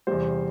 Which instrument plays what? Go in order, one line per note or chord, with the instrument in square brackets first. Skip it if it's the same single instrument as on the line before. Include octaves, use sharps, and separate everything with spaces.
[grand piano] E2 C3 G3 C5